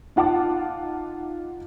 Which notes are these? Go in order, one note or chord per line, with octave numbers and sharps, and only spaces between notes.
D#4 F4 F#5 A5 D6